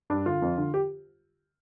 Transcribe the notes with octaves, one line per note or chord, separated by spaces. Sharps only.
G2 D4
D3 F4
F2
D3
G4